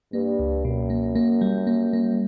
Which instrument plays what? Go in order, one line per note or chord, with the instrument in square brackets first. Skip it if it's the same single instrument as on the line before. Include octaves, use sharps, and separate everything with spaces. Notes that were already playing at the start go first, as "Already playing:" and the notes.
[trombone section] G2 [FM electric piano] A#3
[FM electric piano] C#2
[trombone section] F#2 [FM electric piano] B2
[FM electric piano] A#3
A#3
G3
A#3
A#3